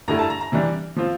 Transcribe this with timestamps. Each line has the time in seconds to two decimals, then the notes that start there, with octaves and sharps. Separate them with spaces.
0.08 G2 D3 A3 E4 A#5
0.19 A5
0.30 A#5
0.41 A#5
0.52 C3 E3 G3 D4
0.96 F3 C4 F4